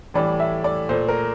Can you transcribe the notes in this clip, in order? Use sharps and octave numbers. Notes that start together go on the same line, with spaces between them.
A2 E3 G3 D5
E5
D5
A#2 A3 C5
A#4